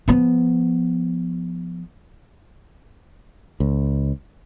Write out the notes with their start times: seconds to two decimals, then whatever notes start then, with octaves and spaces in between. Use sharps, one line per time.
0.08 F3 B3
3.60 C#2